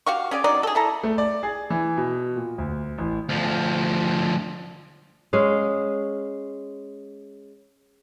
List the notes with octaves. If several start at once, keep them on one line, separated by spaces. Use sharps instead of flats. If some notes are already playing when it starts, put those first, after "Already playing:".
F#4 G4 F5 C#6
C#4 G#4 D5
F#3 C#4 D#4 D5
G#4 A4
E4 A4 A#5
A3
D5
G#4
E3
B2
A#2
D2
A1
D2 F3
G#3 C#4 F5